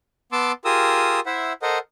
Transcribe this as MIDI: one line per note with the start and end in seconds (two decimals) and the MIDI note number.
0.32 0.52 59
0.32 0.52 81
0.32 0.52 84
0.32 0.52 86
0.32 0.52 88
0.65 1.20 65
0.65 1.20 67
0.65 1.20 68
0.65 1.20 70
0.65 1.20 87
0.65 1.20 88
1.26 1.53 64
1.26 1.53 72
1.26 1.53 76
1.26 1.53 78
1.62 1.79 69
1.62 1.79 70
1.62 1.79 72
1.62 1.79 75
1.62 1.79 78